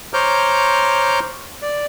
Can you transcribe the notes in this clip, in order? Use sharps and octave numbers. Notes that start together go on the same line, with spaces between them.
C5 C#5 A#5 D6 F6 G6
D5